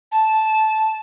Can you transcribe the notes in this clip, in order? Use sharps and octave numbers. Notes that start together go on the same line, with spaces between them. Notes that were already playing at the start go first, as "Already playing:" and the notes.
A5